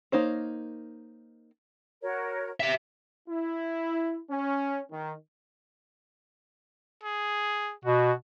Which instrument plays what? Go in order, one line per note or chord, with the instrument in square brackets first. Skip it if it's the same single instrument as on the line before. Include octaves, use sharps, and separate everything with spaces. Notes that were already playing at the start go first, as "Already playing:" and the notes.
[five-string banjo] A#3 D#4 C5 C#5
[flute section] F#4 A#4 C#5
[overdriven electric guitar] G4 E5
[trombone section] E4
C#4
D#3
[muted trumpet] G#4
[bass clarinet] B2 [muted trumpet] F#4